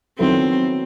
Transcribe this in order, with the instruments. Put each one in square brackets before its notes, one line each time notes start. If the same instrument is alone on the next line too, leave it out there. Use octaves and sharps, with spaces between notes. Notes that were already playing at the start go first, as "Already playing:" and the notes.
[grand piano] D#3 F#3 B3 E4 A4 [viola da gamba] C4